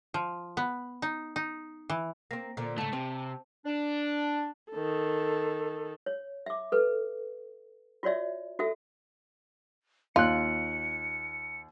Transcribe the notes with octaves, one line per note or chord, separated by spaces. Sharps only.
F3
B3
D#4
D#4
E3
A#3 C4 A#6
A#2 D3 C5 A#5
G#2 C#3 A3 A5
C3 C4
D4
D#3 A4
C#5
E5 D6
A4 B4
F4 F#4 C#5 D5 E5
F#4 A4 E5
D#2 F4 F#6 C#7